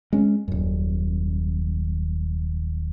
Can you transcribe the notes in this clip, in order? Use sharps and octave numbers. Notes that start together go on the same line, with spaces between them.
G#3 C#4
D#1 F#2